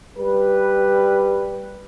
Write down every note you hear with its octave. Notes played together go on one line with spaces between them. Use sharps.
G3 B4